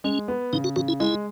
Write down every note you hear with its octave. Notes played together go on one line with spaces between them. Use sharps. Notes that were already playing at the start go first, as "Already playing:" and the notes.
G#3 C#4
B3
C#3 D#4
F#4
C#3 F#4
E4
G#3 E4